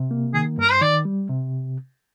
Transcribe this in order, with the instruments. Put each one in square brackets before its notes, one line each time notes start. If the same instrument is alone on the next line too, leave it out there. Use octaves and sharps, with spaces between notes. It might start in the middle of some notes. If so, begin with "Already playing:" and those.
Already playing: [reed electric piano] C3
A#3
[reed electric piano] D#3 [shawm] G#4
[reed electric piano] G2 [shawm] A#4
[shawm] C5
[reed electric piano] D#3 [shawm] D5
[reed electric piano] G3
C3